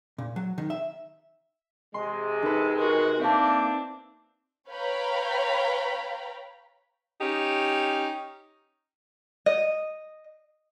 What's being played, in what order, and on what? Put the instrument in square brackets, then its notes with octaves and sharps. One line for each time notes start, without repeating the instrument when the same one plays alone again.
[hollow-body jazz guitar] A#2
F#3
D#3
E5
[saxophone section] C3 G#3 [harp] C6
[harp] D#4 B4 [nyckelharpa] A4
[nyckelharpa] F#4 A#4
[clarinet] A#3 [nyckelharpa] C4 D4 [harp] E5 A5
[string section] B4 C#5 F5 G5 A#5 B5
[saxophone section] C#4 D#4 G4
[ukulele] D#5